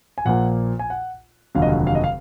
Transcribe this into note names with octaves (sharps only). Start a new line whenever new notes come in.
G#5
A#1 A#2 F3 A#3 F#5
G#5
F#5
F1 D#2 D3 F#3 F5
D#5
F5
F5
D#5
F5